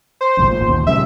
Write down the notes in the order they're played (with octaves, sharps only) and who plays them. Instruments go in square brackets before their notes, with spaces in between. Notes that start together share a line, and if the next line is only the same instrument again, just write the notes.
[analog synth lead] C5
[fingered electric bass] G1 C2 F2
G#1 A#2
D#2
[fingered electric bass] A#2 C#3 G3 [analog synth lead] E5